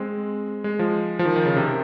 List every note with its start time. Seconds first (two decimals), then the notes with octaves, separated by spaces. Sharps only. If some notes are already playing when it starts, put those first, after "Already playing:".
Already playing: G#3 C4
0.64 G#3
0.79 F3
1.19 F3
1.25 D#3
1.36 D#3
1.46 C#3
1.56 C3
1.66 D#3